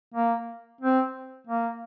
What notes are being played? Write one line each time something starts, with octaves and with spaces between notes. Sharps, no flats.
A#3
C4
A#3